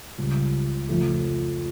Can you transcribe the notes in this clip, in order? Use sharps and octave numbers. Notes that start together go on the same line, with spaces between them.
C#2 C#3 G3
F2 C#3 F3 A3